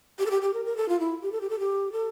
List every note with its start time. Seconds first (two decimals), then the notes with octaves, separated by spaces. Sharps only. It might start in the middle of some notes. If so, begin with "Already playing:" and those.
0.19 G4
0.26 A4
0.31 G4
0.42 G4
0.54 A#4
0.66 A#4
0.77 A4
0.89 F4
1.00 E4
1.23 G4
1.32 A4
1.41 G4
1.50 A4
1.59 G4
1.92 A4